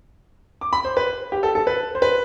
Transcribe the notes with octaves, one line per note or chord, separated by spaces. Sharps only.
D6
B5
C5
B4
G4
A4
A4
B4
C5
B4